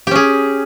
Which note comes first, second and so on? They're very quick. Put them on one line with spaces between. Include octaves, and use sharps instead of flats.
G4 C#4 G#4